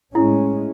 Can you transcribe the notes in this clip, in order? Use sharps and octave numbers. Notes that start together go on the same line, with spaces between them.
A2 G#3 C#4 E4